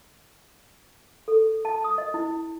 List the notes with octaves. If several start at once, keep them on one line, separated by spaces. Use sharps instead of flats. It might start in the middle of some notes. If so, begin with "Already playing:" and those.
A4
A5
D#6
D#5
E4